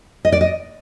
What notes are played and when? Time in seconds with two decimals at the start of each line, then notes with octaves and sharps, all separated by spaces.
0.25 D#5
0.32 D5
0.41 D#5